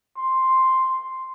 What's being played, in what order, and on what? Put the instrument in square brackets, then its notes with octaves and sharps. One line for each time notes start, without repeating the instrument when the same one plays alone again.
[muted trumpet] C6